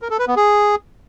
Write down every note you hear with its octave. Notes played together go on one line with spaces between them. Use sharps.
A#4
A4
B4
B3
G#4